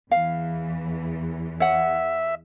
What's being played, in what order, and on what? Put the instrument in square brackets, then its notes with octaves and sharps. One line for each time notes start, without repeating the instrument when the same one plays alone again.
[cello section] E2 E3 [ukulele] F5
[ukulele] C#5 F#5 [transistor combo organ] E5